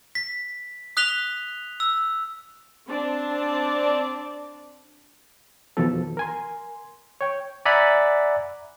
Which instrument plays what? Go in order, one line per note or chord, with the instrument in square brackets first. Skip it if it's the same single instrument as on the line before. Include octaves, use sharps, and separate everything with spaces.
[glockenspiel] B6
D#6 F#6 B6 F7 G7
E6
[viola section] C4 D4 D5 A5
[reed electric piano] E2 B2 D#3 F3 A4
A#4 G#5 C6
C#5 G5
[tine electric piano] D5 E5 F#5 G#5 A#5 B5